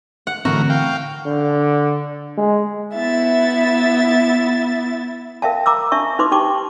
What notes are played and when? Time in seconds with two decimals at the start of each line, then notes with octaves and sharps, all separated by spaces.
0.27 F#5
0.45 A2 D3 E3 C4 F#4 A#4
0.70 F5 G5
1.26 D3
2.37 G#3
2.95 B3 E4 E5 A6
5.42 A#4 E5 F5 G5 A5
5.66 A#5 D6 E6
5.92 D4 E5 A5 C#6
6.19 D#4 B4 C6 D6
6.32 D#4 G4 G5 A5 C#6 D6